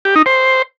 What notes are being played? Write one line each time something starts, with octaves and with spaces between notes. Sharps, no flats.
G4
D#4
C5